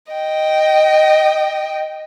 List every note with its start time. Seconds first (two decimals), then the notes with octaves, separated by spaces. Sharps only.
0.12 D#5 G5